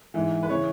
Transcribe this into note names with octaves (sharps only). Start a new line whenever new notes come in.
G#2 E3
B4
C#3 E3 C#5